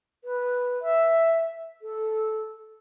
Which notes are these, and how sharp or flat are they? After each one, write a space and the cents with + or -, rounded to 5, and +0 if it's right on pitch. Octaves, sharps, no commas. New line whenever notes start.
B4 -5
E5 +0
A4 -10